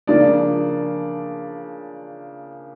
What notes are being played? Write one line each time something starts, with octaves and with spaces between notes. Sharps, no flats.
C#3 F3 A#3 D4 D5